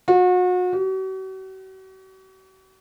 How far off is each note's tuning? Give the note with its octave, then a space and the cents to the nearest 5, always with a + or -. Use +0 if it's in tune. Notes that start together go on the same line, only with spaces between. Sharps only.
F#4 -35
F#4 +45